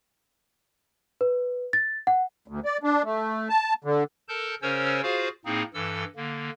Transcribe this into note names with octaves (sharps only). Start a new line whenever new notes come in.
B4
A6
F#5
D2
D5
D4
A3
A5
D3
A4 A#4 A5 G6
C#3 C#4 A#4 C5 C#5 E6
F4 F#4 G#4 C5 F5
A2 A#3 C4 D#4 G#4
G2 E3 A4 E6
D3 A#3